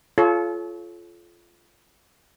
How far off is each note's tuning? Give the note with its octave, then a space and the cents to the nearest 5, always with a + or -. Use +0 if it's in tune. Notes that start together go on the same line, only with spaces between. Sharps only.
F4 -10 A4 -35 C#5 +0